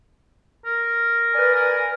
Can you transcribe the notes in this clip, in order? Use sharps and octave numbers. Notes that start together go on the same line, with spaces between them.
A#4
B4 D5 G#5
A#4